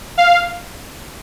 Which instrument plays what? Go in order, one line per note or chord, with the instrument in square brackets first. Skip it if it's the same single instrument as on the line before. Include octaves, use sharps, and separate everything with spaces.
[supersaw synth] F5